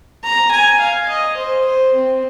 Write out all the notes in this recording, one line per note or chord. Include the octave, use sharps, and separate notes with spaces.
A#5
G#5
F5
D#5
C5
C5
C4